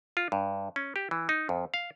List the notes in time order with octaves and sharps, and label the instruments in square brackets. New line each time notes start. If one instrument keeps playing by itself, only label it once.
[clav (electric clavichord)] F4
G2
C#4
G4
E3
D#4
F2
F5